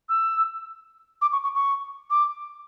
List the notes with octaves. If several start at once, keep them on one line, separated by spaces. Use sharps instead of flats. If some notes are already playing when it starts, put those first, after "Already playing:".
E6
D6
C#6
C#6
C#6
D6